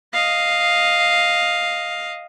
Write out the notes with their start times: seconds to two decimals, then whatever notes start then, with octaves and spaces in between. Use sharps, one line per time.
0.13 D#5 F5